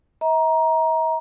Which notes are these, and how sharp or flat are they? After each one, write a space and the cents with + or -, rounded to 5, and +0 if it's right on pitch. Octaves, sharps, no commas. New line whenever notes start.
E5 -45 A#5 +15